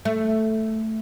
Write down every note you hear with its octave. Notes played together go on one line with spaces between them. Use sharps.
A3